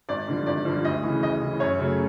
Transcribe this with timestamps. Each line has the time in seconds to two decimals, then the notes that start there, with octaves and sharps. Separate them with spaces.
0.09 G#1 D5
0.27 G2 D3 F3
0.46 G#1 D5
0.65 G2 D3 F3
0.84 D2 D#5
1.03 C#3 E3
1.22 D2 D#5
1.41 C#3 E3
1.60 F#2 C#5
1.79 C#3 F#3 A3